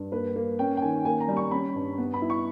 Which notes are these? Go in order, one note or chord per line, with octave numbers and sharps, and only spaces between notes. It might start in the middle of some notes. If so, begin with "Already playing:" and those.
Already playing: G2
A#3 B4
A#3
C#4 G5
G5
D#3 G#5
A#3 G#5
A#5
G3
C#6
C#4 B5
G2
B3
B5
E4
C#6